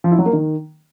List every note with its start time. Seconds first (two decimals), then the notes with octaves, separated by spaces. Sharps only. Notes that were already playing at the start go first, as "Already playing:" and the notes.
0.04 F3
0.11 E4
0.19 F#3
0.26 A#3
0.33 D#3